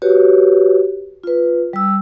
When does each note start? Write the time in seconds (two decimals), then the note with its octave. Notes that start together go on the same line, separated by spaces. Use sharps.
0.02 F#4 G4 B4 C#5
1.24 F4 B4
1.73 G3 E6